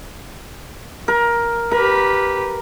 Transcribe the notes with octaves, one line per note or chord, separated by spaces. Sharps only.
A#4
G4 A#4 B4